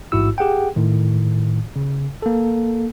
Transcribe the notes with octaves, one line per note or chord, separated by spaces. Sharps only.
A1 G#2 E4 F#4 E6
G4 G#4 F#5 G5
A2 D#3
C#3
A#3 A4